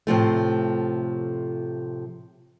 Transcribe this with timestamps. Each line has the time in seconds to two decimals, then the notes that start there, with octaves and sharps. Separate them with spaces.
0.07 A2 C3 F3 A3